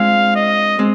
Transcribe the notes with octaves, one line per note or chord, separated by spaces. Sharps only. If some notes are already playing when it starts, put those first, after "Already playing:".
Already playing: G#3 C4 D4 F4 F5
D#5
G#3 C4